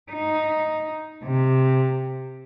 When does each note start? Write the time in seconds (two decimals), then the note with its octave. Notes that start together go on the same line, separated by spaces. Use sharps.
0.12 D#4
1.24 C3